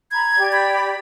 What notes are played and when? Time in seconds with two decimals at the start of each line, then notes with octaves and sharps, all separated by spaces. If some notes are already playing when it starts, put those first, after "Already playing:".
0.11 A#5 B5 G#6
0.38 G4 D5 G5
0.52 B5